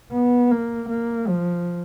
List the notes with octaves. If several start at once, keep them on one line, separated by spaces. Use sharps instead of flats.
B3
A#3
A#3
F3